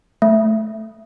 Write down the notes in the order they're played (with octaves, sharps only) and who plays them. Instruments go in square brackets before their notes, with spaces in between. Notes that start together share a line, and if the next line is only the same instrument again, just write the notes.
[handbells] A3